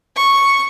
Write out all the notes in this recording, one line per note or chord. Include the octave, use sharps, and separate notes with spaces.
C#6